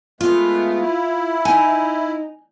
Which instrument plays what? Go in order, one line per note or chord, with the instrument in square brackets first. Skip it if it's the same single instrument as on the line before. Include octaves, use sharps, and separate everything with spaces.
[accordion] G#3 A3 B3 [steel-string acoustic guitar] F4
[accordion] E4
[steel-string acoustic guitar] D#4 [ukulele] G#5